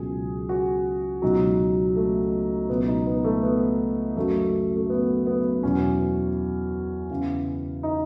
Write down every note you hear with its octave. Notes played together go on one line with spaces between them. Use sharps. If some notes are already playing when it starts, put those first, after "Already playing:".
Already playing: C#2 B2 F#3 G#4
F#4
C#2 B2 F#3 D#4
A3
C#2 B2 F#3 B3
D#4
B3
A3
B3
F#2 C#3 F#3 A3
A3
B3
B3
E2 B2 F#3 C#4
E2 C#3 E3
D#4